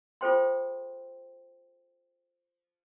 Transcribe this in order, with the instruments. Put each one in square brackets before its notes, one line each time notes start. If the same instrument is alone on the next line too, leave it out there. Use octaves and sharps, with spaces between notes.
[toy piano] F4 G#4 A4 C5 G5 C6